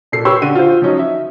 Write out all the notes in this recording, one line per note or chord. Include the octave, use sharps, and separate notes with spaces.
A#2 A4 C7
G4 B4 C#5 C6 C#6 E6
D3 D#7
F4 C5
F3 F#3 C#4 D#4
E5